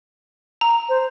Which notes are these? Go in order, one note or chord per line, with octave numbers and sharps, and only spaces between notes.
A#5
C5